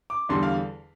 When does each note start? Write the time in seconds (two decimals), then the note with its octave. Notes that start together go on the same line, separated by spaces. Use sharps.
0.10 D6
0.29 E2 D3 G3 C6
0.43 F5